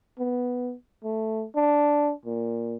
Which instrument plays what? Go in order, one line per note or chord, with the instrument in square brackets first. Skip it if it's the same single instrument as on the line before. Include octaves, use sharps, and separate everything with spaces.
[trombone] B3
A3
D4
A#2